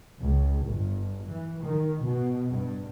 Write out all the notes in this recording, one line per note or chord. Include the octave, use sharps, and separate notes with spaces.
C#2
G1
E3
D#3
B2
G2